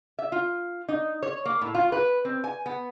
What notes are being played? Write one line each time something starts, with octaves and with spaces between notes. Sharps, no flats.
E5
F4
D#4
C#5
A#3
A2
F4
B4
C4
G#5
B3